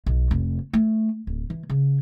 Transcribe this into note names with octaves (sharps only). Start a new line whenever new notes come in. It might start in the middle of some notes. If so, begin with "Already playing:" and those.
B1
F1
A3
D1
E3
C#3